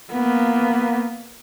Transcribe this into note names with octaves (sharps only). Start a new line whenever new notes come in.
A#3 B3